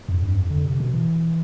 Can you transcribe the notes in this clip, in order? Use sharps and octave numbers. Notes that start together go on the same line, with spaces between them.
F2
G2
F2
D3
C3
B2
E3